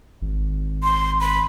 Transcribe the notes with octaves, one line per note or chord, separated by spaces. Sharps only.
G#1
C6
B5